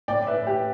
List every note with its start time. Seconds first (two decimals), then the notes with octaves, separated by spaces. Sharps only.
0.08 A2 D5 G5
0.27 B4 E5
0.37 A2
0.47 G4